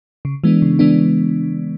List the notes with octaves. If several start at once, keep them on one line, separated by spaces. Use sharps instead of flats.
C#3
E3 G#3 B3 D4
C#3
E3 G#3 B3 D4